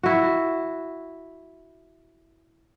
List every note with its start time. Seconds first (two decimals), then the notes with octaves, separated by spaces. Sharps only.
0.03 E4 F#4